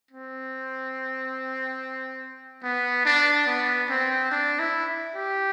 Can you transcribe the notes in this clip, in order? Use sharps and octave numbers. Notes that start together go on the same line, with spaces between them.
C4
B3
D4
B3
C4
D4
E4
G4